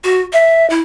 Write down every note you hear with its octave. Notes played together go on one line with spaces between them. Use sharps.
F#4
E5
E4